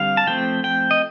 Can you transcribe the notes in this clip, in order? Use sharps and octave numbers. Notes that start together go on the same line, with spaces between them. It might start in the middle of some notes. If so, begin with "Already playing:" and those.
Already playing: D3 G3 C4 F5
A5
F3 A3 C4 G5
G5
D#5